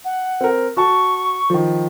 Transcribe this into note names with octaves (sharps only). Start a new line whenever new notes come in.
F#5
C4 A#4
F#4 A5 C#6
D#3 F3